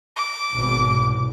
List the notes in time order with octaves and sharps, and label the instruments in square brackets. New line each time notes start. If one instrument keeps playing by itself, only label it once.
[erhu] D6
[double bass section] G#1 G#2 B2
C2